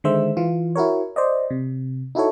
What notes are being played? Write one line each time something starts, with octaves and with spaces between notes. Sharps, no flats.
D3 D#3 G#3 C5 E5 E6
E3 F4
E4 F#4 A#4 C#5
C5 D5 D#5
C3
D#4 E4 F#4 A4 C#5